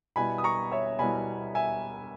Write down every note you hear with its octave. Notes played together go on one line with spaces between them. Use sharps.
B2 G3 B3 E4 G#5 B5
D#6
A#5 C#6
C#5 E5
B2 G3 B3 E4 G#5 B5
E5 G#5